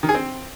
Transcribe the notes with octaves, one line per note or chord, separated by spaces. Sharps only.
D#3
G#4
C4